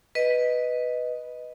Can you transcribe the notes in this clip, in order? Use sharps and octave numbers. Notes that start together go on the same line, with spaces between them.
B4 D#5